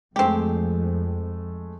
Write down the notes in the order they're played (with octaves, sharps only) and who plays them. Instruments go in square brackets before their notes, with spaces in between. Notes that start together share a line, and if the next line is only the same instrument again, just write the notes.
[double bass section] F2 [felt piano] G#3 A3 [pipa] C4 G4